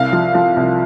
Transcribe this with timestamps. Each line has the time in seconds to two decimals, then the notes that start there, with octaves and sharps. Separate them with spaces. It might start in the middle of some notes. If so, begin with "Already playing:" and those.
Already playing: C2 F5
0.13 F3
0.34 F3
0.56 C2